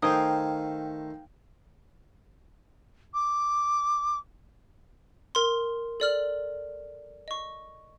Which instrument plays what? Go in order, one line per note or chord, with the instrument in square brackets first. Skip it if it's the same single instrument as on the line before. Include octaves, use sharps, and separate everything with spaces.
[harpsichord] D#3 A3 [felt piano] D#4 C5 [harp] F5 G5 G#5 [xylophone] D#6
[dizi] D6
[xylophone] A#4 C6
A4 D5 F6 F#7
D#5 C#6